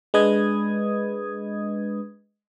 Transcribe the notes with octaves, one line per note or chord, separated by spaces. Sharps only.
G#3 D4 B4 D#5 D#6 G#6